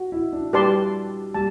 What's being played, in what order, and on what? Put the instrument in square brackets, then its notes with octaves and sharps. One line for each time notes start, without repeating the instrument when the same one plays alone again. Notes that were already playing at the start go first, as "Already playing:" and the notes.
Already playing: [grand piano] F#4
E4
D4
[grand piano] G3 [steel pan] G4 B4 D5 A5 C6
[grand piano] G3 [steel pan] A5